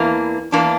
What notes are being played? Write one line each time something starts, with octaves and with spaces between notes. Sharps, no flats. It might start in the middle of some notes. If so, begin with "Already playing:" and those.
Already playing: E2 E3 A#3 D4
E2 E3 A#3 D4